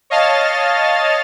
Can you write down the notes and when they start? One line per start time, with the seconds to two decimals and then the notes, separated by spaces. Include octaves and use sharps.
0.10 C#5 D#5 F5 A5 F6 A6